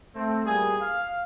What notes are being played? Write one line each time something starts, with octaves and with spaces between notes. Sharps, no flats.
A3 C4
A#2 G3 A#3 B3 G#4 G#5
F5